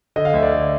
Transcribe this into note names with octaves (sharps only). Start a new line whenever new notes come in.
D3 D#5
F5
D2 E5
D5
D3